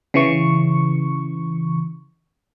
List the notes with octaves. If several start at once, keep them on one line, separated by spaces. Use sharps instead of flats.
C#3 E3 C#6